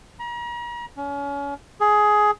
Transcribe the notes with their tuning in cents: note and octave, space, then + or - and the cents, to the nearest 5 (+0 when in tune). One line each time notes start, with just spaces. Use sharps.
A#5 +40
C#4 +30
G#4 +15